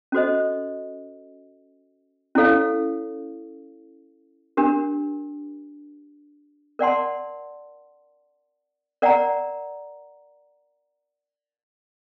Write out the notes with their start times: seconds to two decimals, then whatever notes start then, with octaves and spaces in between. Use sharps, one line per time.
0.12 C#4 F#4 A4 C5 D#5
2.35 C#4 E4 A4 C#5 F5
4.57 D4 G4 A#4
6.79 A#4 D5 F#5 A5 C6
9.02 A#4 D5 F#5 A#5